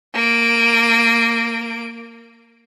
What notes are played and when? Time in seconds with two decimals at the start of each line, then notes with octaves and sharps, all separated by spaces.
0.14 A#3 D7